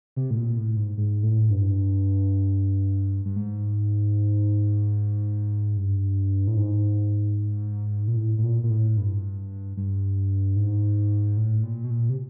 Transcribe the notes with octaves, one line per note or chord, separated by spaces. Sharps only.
C3
A2
A#2
A2
G#2
G#2
A2
G2
G2
G#2
G2
A2
G#2
A#2
A2
A2
A#2
A#2
A2
G2
G2
G#2
A2
A#2
B2
A#2
C3